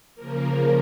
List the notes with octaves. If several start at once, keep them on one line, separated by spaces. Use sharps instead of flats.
C#3 F3 A#3 A#4